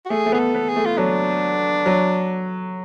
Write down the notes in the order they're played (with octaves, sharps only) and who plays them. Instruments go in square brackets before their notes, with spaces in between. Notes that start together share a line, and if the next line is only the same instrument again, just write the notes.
[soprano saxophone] F#4
[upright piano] A3 [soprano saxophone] G#4
[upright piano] A3
[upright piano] B3 [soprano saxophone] G#4
[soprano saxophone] A4
[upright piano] B3
[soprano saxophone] G#4
[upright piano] A3
[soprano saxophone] F4
[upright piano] F#3 [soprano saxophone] D4
[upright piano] F#3